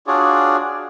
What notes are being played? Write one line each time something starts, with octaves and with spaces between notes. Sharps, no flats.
D4 F4 F#4 G#4 C#5 D5